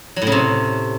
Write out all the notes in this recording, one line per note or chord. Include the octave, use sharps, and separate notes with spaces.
F#3
A2
C#3
C3